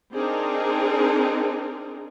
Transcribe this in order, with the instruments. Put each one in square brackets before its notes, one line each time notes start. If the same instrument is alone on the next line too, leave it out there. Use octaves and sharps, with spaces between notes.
[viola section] C4 D4 D#4 G#4 A#4